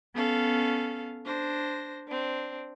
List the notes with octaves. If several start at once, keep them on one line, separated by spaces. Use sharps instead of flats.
B3 C#4 A4 F5
D4 C5 A#6
C4 D4